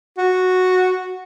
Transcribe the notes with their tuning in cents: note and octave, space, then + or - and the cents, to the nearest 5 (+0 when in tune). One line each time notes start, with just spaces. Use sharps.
F#4 -5